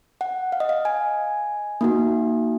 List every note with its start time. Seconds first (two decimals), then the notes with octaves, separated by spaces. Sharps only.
0.21 F#5
0.52 F5
0.60 D#5
0.69 F5
0.85 G#5
1.81 A#3 D#4 F#4